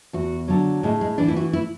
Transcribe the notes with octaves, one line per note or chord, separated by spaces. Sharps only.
E2 F#4
D3 F#3
A2 G#3
G#3
E3 D4
E4
F#4
E4